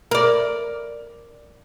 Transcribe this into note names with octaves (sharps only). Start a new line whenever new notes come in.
A#4 D5